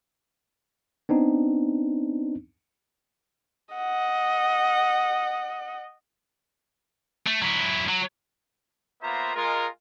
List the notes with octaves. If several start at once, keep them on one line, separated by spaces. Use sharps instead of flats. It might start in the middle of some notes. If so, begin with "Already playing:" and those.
B3 C4 D4 D#4
D#5 F#5
A3
F#3 E4
F#3
A#3 B3 F4 C5 E5 A#5
G#3 F4 A#4